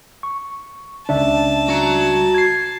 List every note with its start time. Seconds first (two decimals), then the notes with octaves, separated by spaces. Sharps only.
0.23 C#6
1.09 C#2 D4 E5 A5
1.68 F#4 A#5
2.35 G#6 C7